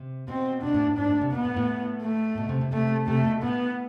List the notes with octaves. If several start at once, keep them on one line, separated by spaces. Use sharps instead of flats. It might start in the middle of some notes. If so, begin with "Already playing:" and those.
Already playing: C3
B2 C4
B2 D4
A2
G#2
G#2 D4
A2
C3
B2 B3
A2
A2
A3
B2
C3
C3
C3 A3
C3 A3
B2
A2 B3